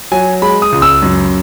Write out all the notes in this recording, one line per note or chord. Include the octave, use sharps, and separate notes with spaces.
F#3 G#5
G#3 B5
D#6
C#2
E6
F#2